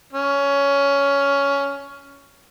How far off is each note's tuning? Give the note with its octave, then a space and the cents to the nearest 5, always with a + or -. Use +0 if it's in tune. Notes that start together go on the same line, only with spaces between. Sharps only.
C#4 +15